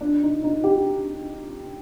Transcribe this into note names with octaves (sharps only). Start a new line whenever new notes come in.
D4
D#4
D#4
G4